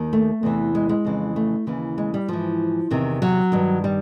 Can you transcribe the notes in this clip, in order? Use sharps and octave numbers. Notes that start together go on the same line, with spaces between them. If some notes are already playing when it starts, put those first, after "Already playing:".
Already playing: D#2 D#3
A3
E2 C3 E3
G#3
G#3
F2 C#3 E3
A3
D#2 C#3 E3
G#3
G3
G#2 E3 F3
E2 C3 D#3
F#3
G2 D#3
G3